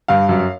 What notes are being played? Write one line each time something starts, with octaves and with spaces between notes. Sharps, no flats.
G2 F5
F#2